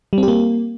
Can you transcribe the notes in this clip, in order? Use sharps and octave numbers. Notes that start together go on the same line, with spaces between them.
G3
C4
G4
A#3